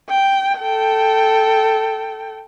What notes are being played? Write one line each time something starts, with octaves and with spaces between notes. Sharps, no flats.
G5
A4 G5